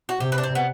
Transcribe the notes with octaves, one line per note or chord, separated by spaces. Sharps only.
F#4
C3 G4
B4
D4
C4
B3